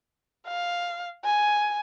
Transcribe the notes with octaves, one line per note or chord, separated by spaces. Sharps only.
F5
G#5